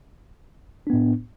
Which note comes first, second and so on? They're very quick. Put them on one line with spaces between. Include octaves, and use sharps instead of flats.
D4 B3 A2